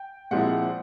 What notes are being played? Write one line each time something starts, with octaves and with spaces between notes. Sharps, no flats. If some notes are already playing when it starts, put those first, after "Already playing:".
Already playing: G5
A#2 F3 G#3 C4 E4 F#5